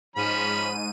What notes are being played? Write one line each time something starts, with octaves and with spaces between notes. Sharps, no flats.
G#2 F3 C#4 B5 D#7